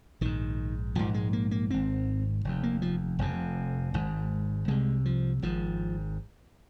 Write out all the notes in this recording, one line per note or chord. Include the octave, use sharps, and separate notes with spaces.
A#1 G#2 D#3
A#1 G#2 F3
G#3
A#3
A#3
G#1 G#2 C4
F1 D#2
A#3
F3
F1 F2 C3
G#1 G#2
C2 C3 G#3
F3
G#1 G#2 F3